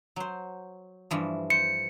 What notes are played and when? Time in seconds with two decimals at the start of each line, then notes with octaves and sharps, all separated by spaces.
0.16 F#3 C5
1.11 G2 E3 F3
1.50 C5 C#7